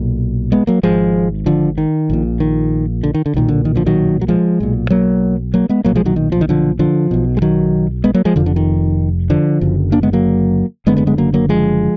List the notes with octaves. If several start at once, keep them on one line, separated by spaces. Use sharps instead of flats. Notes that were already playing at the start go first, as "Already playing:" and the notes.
Already playing: B1 A#2
G#3 B3
F#3 A#3
G#1 G#2 F3 G#3
D3 F3
D#3
A#1 A#2
D#3
D3
D#3
D3
B1 A#2 D#3
D3
D#3
D3 F3
D#3 F#3
F#3
F3 G#3
B1 A#2
F#3 A#3
F#3 A#3
G#3 B3
B1 A#2 F#3 A#3
F3 G#3
D#3 F#3
D#3
F3
D#3
D3 F3
D3 F3
B1 B2
G#3
D#3 F#3
G#3 B3
F#3 A#3
F3 G#3
F1 F2 D3 F3
D3
D#3
D3 F3
F#1 F#2 D3
A#3 D4
G#3 B3
F#3 A#3
F#1 F#2 D3 G#3 B3
G#3 B3
G#3 B3
F#3 A#3
F#3 A#3
F3 G#3